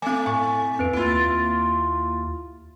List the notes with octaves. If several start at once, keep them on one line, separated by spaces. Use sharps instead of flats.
A3 C4 G#5
A2 G#5 C#6
F2 C4 B4 D7
D#2 A#3 E4 F4 D7